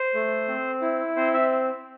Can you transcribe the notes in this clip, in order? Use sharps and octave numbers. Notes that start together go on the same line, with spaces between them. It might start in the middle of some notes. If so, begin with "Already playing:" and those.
Already playing: C5
A3
C4
E4
C4 C5
E5